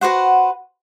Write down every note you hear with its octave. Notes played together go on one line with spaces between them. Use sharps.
F#4 B4 C5 F#5